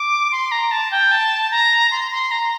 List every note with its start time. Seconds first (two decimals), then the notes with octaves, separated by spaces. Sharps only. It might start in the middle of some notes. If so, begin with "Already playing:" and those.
Already playing: D6
0.32 C6
0.51 A#5
0.71 A5
0.91 G5
1.12 A5
1.51 A#5
1.91 C6
2.11 C6
2.31 A#5